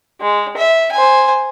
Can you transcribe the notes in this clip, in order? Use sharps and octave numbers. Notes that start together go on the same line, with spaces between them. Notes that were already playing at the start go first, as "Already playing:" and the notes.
G#3
E5
C5 G#5